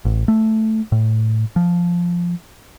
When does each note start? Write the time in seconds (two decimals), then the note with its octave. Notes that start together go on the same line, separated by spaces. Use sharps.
0.05 A1
0.28 A3
0.92 A2
1.56 F3